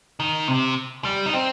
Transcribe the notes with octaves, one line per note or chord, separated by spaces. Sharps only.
D#3
C3
G3
D#4
C4